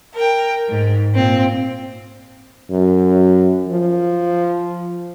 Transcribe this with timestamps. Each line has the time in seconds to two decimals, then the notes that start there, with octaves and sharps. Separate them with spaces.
0.13 A#4 G5
0.68 G#2
1.13 A#2 C4
2.70 F#2
3.68 F3